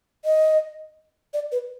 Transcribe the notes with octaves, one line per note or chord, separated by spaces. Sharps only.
D#5
D5
B4